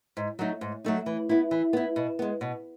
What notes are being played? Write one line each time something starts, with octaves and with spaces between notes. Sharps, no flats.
G#2
F#3 A3 D#4
G#2
F#3 A3 D#4
E3
B3 E4
E3
B3 E4
B2
G#3 B3
B2